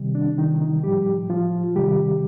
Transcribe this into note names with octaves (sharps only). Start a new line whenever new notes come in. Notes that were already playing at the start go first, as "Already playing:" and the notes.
Already playing: C3 D#3 G3
D4
D#3 D#4
D#3 D#4
A2 F3 G3 G4
F3 F4
C3 D#3 G3 G4